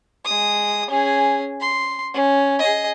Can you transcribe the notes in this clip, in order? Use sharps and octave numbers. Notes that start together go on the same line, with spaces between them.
G#3 D#6
C#4 G#4
C6
C#4
G#4 D#5